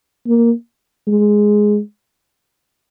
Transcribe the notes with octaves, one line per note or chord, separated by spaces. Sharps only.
A#3
G#3